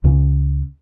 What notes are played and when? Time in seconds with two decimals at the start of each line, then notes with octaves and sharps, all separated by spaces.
0.04 C#2 C#3 C#4